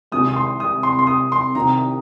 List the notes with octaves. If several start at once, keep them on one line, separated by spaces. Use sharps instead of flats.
C2 C3 D#3 G#3 D#6
D#6
C6
D#6
C6
C6
D#6
C6
C2 C3 D#3 C4 D#4 A#5